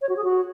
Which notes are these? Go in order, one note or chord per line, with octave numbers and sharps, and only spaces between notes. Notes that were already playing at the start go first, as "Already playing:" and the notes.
C#5
F#4
G#4
F#4